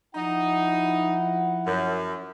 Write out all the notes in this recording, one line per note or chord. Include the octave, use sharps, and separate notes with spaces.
F3 D#4 E4 F#5
F#2